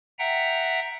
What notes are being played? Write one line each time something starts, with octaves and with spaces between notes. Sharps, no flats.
E5 F#5 G5 A#5